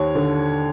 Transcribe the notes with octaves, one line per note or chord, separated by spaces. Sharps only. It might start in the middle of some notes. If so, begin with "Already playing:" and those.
Already playing: D#2 C#5
D3